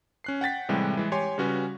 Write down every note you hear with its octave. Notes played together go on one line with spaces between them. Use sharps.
C#4 F#6 C7
F#5 G5 A6 B6
A2 C3 E3 G3 G#3
E3 G#3
G4 C#5 G#5 C6
C#3 G3 C#4 F#4 B4